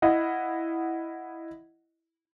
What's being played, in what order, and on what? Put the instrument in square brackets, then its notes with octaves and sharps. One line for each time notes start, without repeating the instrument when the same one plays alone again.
[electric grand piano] E4 D#5 F5 F#5